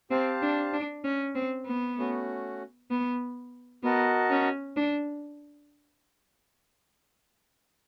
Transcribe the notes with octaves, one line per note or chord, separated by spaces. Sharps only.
C4 G4 C5 F5 A5
D4
D4
C#4
C4
B3
A3 C#4 F#4
B3
B3 F#4 A#4 D#5 F#5 A5
C#4
D4